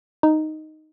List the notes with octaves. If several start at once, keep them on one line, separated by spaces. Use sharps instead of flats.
D#4